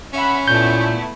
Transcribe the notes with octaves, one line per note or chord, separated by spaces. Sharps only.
C#4 E5 F#5 B5
A#2 A3 B3 E4 G6